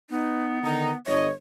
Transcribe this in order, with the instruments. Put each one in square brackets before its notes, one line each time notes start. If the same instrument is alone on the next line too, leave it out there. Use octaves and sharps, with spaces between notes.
[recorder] B3 [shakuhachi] D#4
[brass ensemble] D3 D#3 D#4 [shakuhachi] A#5
[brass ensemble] G1 D#5 [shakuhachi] C#5